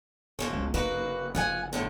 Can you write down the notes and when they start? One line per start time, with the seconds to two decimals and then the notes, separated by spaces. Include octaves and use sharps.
0.39 F#1 B2 F3 C#4
0.53 C#2
0.74 A#3 D#4 F#4 B4
1.35 F3 F4 F#5 G#5
1.73 E2 A2 D3